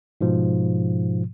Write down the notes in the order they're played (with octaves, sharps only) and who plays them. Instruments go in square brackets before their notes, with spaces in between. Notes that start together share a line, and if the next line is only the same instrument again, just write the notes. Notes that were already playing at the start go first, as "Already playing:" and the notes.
[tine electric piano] G#2 B2 F3